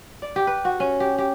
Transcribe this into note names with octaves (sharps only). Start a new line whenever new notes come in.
D5
G4
B4
F#4
C#4
G4
G4